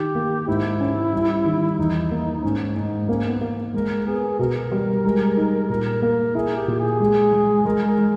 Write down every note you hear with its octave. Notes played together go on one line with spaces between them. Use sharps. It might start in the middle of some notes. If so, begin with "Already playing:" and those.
Already playing: D#3 G4
A#3
G#2 E4
C#4
G3
D#3
E2 D#4
A#3
G#2 C#4
G#2 D#4
A#3 C#4
B3
A#3
G#3 A#4
B3 G#4
B2 A#4
G3
G#3
D#4
A#2 A#4
A#3 A#4
E4 G#4
G4
A#2
G#4
G#3
G#3
G#3 A#4
A#4
G#3